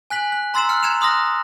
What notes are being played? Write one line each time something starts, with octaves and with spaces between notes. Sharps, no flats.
G#5 F#6 B6 F#7
F#6
A#5 C6 E6 A6 C7 E7
F6 F#6 C#7
A#5 G#6 C#7 E7 F7
C6 D#6 F6 F#6 A#6